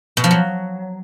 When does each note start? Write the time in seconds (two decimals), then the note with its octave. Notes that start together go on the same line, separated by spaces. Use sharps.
0.17 B2
0.24 F3
0.31 F#3